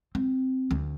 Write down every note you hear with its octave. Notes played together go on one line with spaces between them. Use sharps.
C4
D2